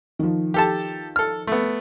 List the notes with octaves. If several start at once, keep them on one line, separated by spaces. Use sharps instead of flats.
D#3 F3
G4 A4 A5
A4 F6
A3 B3